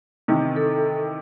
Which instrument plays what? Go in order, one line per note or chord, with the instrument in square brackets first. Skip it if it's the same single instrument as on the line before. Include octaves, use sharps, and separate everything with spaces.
[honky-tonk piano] C3 D#3 E3
[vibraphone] A4